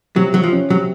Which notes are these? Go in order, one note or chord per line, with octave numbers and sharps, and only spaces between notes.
C3 F#3
C3 F#3
F3
C#4
C3 F#3